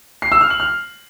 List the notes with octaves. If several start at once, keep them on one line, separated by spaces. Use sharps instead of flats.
C7
E6
F6
F#7
F6